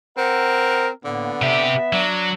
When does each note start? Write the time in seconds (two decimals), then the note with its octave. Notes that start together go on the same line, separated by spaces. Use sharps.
0.17 C4 A#4 F#5
1.05 A2 D3 A#3 B3
1.42 C3 G4 E5
1.93 F#3 D4